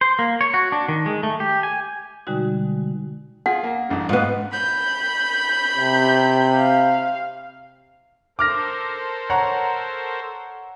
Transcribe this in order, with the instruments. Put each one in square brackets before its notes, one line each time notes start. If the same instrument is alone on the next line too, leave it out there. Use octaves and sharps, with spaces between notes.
[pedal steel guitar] C5
A#3
C#5
F#4
D4
D#3
G#3
A3
G4
G#5
[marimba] B2 D3 G3 G#3 D#4 F#4
[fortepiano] F4 G#4 [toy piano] F#5
[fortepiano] A#3
A1 G2 C#3
[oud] G#2 B3 [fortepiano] F4
[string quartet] B5 G6
[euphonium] C3
[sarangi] F5
[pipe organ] A4 A#4 C5 [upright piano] D6 F6 A#6
[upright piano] C#5 F#5 A#5